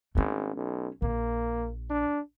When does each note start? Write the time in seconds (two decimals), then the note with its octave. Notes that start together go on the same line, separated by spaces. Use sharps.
0.15 G#1 A3 C#4
0.56 B1
1.02 A#1 A#3
1.90 D4